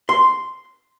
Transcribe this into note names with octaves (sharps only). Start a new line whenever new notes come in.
C6